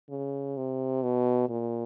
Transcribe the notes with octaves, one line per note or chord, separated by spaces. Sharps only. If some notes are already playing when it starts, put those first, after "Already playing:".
C#3
C3
B2
A#2